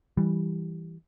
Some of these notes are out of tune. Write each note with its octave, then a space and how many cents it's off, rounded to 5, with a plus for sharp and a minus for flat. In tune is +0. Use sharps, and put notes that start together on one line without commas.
E3 +0 G3 +0